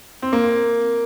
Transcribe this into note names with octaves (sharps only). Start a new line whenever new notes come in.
C4
A#3